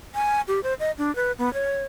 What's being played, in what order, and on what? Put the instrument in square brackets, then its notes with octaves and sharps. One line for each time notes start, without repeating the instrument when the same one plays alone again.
[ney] G#5
G4
C5
D#5
D4
B4
B3
C#5